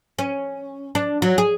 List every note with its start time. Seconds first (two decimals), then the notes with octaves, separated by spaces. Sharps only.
0.19 C#4
0.95 D4
1.22 F#3
1.38 G#4